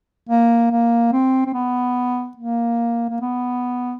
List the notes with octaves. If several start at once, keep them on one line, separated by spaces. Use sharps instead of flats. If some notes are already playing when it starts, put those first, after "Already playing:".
A#3
A#3
C4
C4
B3
A#3
A#3
B3